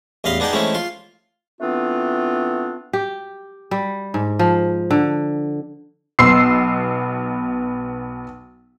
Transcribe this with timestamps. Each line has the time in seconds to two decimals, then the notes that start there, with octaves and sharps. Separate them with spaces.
0.24 A1 E2 D#5 F5 B5 C6
0.40 B3 D4 D#4 G#4 G5
0.53 E3 G#3 A3 C4 C#4 E4
0.74 F4 C6
1.61 E3 A3 B3 C4 D4 F4
2.93 G4
3.71 G3
4.14 G#2
4.39 F3
4.90 D3
6.19 B1 B3 C6 E6 C7